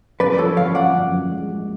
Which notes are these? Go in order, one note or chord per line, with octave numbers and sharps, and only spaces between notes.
F#2 B4 D5
F3 A4 C#5
F#2 C#5 F5
F#2 D5 F#5
F#2
F#2
G#3
G#3